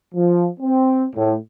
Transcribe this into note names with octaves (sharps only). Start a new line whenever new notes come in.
F3
C4
A2